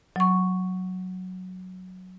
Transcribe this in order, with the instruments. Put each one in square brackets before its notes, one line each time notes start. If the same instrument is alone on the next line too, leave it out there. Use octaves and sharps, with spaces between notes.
[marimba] F#3 C#6